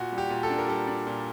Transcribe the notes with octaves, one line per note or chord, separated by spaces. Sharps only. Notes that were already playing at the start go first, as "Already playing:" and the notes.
Already playing: A#2 F#4
G3
G4
A#2
A4
D4
A#4
G3 A4
D4
A#2